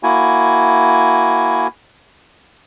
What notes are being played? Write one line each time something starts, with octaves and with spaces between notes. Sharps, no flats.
A#3 E4 F#4 G#5